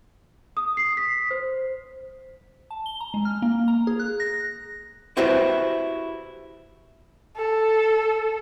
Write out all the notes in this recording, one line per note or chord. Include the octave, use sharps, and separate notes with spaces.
D#6
C7
B6
C5
A5
G7
A#5
G#3
F6
A#3
A#5
G#4
F#6
A#6
E4 F#4 G4 B4 C5 E5
A4